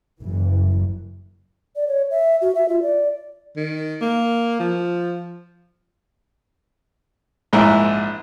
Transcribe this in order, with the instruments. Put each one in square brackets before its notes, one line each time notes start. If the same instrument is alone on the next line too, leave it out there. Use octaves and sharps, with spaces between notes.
[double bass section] F#1 E3
[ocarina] D5
C#5
E5
F#4
E5
F4
D5
[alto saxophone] D#3
A#3
F3
[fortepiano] A#1 G#2 E4 A#4